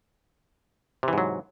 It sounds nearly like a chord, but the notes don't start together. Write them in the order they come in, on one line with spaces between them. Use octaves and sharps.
C3 E3 G#2 F#3